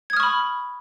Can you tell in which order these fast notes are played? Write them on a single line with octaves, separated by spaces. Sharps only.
G#6 D#6 F6 C#6 B5